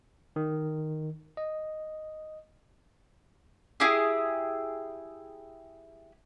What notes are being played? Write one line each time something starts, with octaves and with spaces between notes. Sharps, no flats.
D#3
D#5
E4 G4 G#4